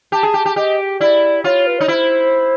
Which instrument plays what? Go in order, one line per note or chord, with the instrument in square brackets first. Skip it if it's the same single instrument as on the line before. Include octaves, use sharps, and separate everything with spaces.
[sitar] G4 [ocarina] A5
[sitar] G#4
G4
G4
[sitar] G4 [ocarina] D#5
[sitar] E4 [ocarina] D5
[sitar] F4 [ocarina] C#5
[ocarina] B4
[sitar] D#4 [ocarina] C#5
[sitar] E4 [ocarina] C5